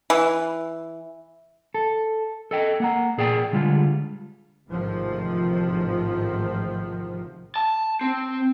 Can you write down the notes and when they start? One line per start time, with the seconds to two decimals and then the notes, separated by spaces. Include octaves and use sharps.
0.10 E3
1.74 A4
2.51 A4 D#5 G5
2.80 A#3 F#5 A#5
3.18 A#2 G#4 D5 G5
3.53 D3 G3 G#3 F4
4.68 A1 G#2 C3 D#3 F3
7.56 A5
8.01 C4